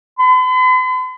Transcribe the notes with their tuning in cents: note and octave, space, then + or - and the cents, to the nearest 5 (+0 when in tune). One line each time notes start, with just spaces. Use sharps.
B5 +45